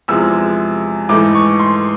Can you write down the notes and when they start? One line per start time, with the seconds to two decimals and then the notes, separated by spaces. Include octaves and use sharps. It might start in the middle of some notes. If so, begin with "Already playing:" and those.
0.08 E2 C3 F3 G#3 E6
1.09 G#2 E3 A3 D6
1.35 C#6
1.60 C6